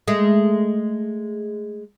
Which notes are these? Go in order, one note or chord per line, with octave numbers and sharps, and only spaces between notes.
G#3 A3